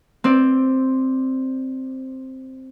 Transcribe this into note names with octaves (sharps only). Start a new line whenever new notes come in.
C4 D5